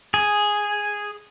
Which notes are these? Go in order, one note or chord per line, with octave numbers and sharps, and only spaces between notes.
G#4